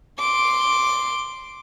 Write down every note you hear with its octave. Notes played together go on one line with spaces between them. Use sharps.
C6 D6